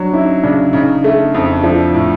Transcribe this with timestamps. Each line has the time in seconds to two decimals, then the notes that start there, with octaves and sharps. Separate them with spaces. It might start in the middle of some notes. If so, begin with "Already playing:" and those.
Already playing: F#3 D4
0.13 C#4 D#4 E4
0.43 C#3 D4
0.73 C#3 C#4 D#4
1.04 A3
1.35 F2
1.64 F3 D4 E4
1.94 A2